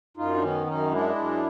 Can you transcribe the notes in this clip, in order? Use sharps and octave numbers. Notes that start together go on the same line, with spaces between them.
F#2 D#4 F4
D4
D#3 B3 C#4
F#2 C#4 D#4
G#3 D4 E4
F#2